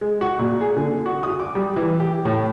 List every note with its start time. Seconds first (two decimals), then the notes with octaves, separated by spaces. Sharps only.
0.01 G#3
0.21 F#4
0.39 A#2
0.61 G#4
0.77 D3
1.06 F#4
1.23 D#6
1.40 D6
1.55 G3
1.76 E3
2.00 G4
2.25 A2